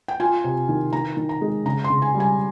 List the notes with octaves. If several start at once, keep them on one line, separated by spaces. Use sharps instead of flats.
G5
F4 G#5
C3
D#3
D#3 A#5
D#3
A#5
G#3
C#3 A#5
C6
C#3
G#5
G3
G#5